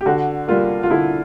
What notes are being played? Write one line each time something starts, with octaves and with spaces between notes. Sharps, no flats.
G4
D3 F#4
G3 A#3 F4
F4
D3 E4